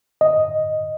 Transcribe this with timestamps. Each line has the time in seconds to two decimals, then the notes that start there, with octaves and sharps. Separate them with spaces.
0.21 D#5